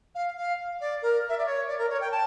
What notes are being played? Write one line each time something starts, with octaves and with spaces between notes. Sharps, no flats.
F5
F5
D5
A#4
E5
D5
C#5
D5
A#4
C#5
G5
A5